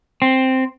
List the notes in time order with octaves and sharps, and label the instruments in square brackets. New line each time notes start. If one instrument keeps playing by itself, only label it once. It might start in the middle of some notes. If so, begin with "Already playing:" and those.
[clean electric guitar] C4